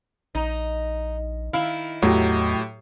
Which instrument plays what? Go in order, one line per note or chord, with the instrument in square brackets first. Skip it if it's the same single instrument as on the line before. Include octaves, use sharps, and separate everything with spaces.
[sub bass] A#1 [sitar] D#4
[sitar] D#3 E4 [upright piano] F5
[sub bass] E2 [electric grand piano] A2 G4 [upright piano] F#3